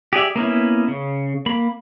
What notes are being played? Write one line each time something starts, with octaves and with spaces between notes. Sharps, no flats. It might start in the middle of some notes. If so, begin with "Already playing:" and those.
G4 G#4 D5 E5
A#3 B3 C#4 E4
C#3
A#3 B5